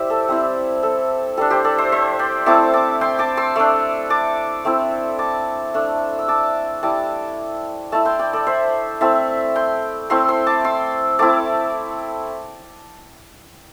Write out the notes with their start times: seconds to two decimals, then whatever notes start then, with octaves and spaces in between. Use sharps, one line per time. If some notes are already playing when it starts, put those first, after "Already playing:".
Already playing: E4 G4 C5 D5 E5
0.10 A4
0.28 G3 C4 E4
0.83 A4
1.37 G3 D4 A4
1.50 G4 C5
1.64 A4 D5
1.78 C5 E5
1.92 C5 E5
2.19 D5 G5
2.46 A3 C4 E4 A5 D6
2.73 A5 D6
3.01 G5 C6
3.19 A5 D6
3.37 C6 E6
3.56 A3 D4
4.10 A5 D6
4.65 A3 C4 E4
5.19 A5 D6
5.74 A3 D4
6.19 E6
6.28 A5 D6
6.83 G3 E4 A5 D6
7.92 A3 E4 E5 A5
8.05 G5 C6
8.19 D5 G5
8.33 A4 D5
8.47 C5 E5
9.01 A3 C4 E4 E5 A5
9.56 G5 C6
10.10 A3 C4 E4 G5 C6
10.28 C6 E6
10.47 A5 D6
10.65 C6 E6
11.19 A3 C4 E4 A5 D6